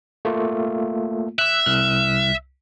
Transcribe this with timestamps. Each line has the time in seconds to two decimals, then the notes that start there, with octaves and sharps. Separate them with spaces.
0.25 A3 A#3 F4
1.39 E5 E6 F#6
1.66 C2 F6 F#6